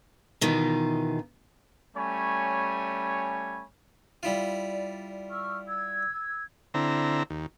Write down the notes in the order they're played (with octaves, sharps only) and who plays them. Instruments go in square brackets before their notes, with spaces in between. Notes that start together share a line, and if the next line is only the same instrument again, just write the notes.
[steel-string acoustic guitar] B2 D#3 E3 D#4 F4
[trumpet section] G3 A3 C#4 C#5 G#5 B5
[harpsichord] G3 E4 F4
[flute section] D5
C#6 E6 F6
E6 G#6
[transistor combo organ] D3 C4 E4 A#5
D#2